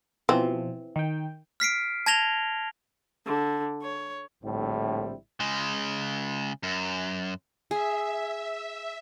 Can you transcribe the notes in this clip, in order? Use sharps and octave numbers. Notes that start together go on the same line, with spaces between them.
B2 E3 F3 C4
D#3 G5
F6 B6 C7 D7
A5 G#6 A#6 F7 G7
D3
C#5
A#1 A2 D3 G3 C4 E4
C#3 G#3
F#2
G#4 E5